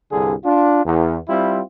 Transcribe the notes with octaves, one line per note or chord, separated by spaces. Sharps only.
C2 G2 D3 G#4
D4 F4
E2
G3 C4 E4 F4